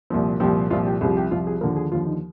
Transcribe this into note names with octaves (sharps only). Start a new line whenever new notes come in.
C2 A#2 F3
C2 A#2 F3 G4
C2 A#2 F3 F4
G4
C2 C3 F3 G#4
G4
C2 C3 F3 F4
G#4
D#2 D3 F3 A#4
G#4
D#2 D3 F3 F4
D#4